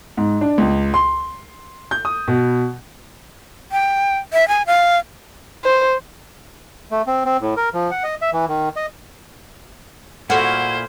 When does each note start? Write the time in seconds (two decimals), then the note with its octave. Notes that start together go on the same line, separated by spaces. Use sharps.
0.17 G#2
0.41 D4
0.58 C#2
0.94 C6
1.91 G6
2.05 D#6
2.28 B2
3.72 G5
4.33 E5
4.48 G#5
4.67 F5
5.64 C5
6.91 A3
7.07 C4
7.25 C4
7.41 A2
7.57 A#4
7.74 F3
7.91 F#5
8.03 D#5
8.22 E5
8.33 E3
8.48 D#3
8.76 D#5
10.30 A#2 E4 F#4 A4 C5 F6 G#6